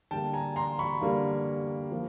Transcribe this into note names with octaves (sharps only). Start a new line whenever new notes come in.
D3 G3 A#3 G5 A5
G#5 A#5
A#5 C6
B5 C#6
D3 G3 A#3
F3 A#3